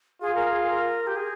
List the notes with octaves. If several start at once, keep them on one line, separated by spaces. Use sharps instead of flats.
F4 G#4
A#4
G#4
A#4
G4
G#4